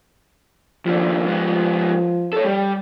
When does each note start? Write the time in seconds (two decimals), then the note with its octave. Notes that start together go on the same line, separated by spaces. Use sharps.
0.86 D#2 D3 F3
1.26 G#2 B3
2.33 A4 C#5
2.44 G3